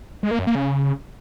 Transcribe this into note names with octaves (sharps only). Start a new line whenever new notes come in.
G#3
A#3
F#2
A#3
C#3